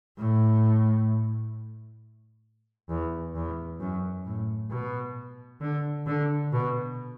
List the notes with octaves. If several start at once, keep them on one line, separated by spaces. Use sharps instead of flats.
A2
E2
E2
F#2
A2
B2
D3
D3
B2